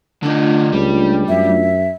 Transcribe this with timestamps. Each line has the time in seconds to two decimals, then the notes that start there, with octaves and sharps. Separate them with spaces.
0.23 D3 A3 D4 D#4 F4
0.72 C#2 G3
1.29 F#2 E5